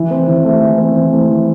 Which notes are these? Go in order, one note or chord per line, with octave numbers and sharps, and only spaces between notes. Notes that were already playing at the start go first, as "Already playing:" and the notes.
Already playing: E3
C4
E3
A3
E3
C4
E3
A3
E3